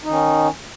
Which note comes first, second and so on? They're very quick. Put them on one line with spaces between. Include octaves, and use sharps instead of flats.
D#4 D#3 C#4